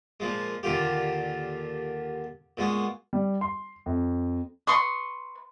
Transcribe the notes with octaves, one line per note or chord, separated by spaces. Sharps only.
A#2 F3 G#3
D#2 A#2 D3 F4 G4
A#2 G#3 B3 F#4
G3
C6
F2
B4 C6 C#6 D#6